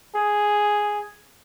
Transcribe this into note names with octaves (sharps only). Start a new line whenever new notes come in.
G#4